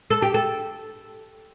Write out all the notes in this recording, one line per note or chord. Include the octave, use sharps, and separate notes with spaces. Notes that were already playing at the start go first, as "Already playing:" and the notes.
A4
G4
A4